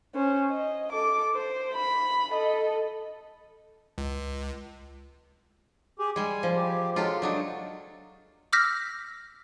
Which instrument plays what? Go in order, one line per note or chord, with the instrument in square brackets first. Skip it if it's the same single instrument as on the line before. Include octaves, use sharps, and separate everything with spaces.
[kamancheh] C#4 C5
D#5
A4 D6
C5
B5
A4 D#5
[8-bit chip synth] C#2
[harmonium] G4 G#4
[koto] G3 G#3 [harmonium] G#5
[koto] F3
[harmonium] G4
[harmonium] F#3 G#3 [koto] F4 G4 A4
[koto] F#3 D4 F#4 [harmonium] D#4
[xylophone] D6 E6 F6 G6 A#6 B6